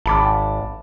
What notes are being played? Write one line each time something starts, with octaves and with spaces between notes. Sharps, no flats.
G#1 A5 B5 D6